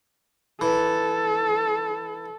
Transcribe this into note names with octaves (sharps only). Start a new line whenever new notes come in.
E3 A4